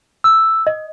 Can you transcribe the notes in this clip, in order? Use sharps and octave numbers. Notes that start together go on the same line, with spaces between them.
E6
D#5